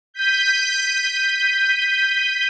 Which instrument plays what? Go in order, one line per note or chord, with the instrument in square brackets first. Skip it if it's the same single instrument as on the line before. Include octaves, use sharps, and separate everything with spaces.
[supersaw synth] G6 B6 D#7